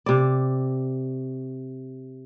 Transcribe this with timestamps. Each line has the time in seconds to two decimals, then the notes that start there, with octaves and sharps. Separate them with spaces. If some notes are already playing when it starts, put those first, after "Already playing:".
0.06 C3 D5